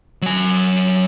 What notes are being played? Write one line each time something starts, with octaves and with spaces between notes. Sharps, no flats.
F#3 G#5